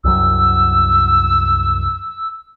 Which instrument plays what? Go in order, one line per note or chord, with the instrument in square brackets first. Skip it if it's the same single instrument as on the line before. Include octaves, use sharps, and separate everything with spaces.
[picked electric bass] C2 F#2 F#3 [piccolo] E6